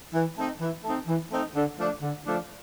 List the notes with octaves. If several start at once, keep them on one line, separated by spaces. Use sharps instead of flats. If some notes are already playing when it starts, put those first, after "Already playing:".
E3
A3 C4 D#4
E3
A3 C4 D#4
E3
A3 C4 D#4
D3
F3 A3 D4
D3
F3 A3 D4